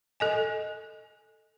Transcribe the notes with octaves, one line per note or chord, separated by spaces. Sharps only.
A4 D#5 G#5